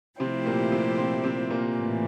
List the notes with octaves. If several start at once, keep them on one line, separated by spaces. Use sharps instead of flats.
C3 F3 A3 C4 E4 G4 C5
A#2 A#3
C3 C4
C3 C4
C3 C4
A#2 A#3
A2 E3